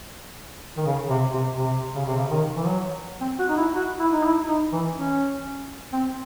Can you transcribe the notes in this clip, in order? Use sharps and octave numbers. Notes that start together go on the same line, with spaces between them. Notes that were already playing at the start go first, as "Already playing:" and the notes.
D#3
C#3
C3
C3
C3
C#3
C3
C#3
D#3
E3
F#3
C4
F#4
D#4
E4
F#4
E4
D#4
E4
D#4
E3
C#4
C4